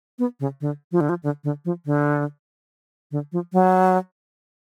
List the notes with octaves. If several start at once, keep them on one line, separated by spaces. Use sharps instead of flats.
B3
C#3
D3
F3
D3
F3
D3
D3
F3
D3
D3
F3
F#3